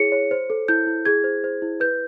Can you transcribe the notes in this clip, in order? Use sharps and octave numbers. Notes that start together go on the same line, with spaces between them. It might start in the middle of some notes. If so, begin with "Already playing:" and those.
Already playing: E4 G#4 C#5 C#7
C#5
C5
A4
E4 G6
E4
G#4 G#6
C5
C5
E4
B4 G6